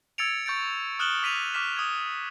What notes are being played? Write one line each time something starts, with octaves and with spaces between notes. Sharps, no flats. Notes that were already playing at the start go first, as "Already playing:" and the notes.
E6 G#6 A6 C#7 D7 F7
C#6 G6 A6 D7
D#6 F6 F#6 E7 F#7 G7
D6 B6 D#7 F7
C#6 D6 F6 B6 E7
D#6 G#6